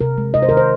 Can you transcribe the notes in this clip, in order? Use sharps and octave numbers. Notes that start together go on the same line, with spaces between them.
C3 A#4
G#3
C3 D#5
C5
A#4
D#3
C5